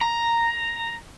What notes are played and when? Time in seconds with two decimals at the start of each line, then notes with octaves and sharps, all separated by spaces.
0.01 A#5